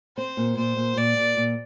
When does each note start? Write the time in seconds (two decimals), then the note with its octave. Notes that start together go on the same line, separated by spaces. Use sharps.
0.17 C4 C5
0.37 A#2
0.57 A#2 C5
0.77 A#2
0.96 A#2 D5
1.17 A#2
1.37 A#2